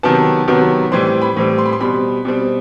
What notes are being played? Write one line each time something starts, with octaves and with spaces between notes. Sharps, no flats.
C3 D#3 F#3 B3 A5
C3 D#3 F#3 B3
A2 E3 G3 C4 C6
B5
A2 E3 G3 C4
C6
B5
C6
B2 G3 C4 B5
B2 G3 C4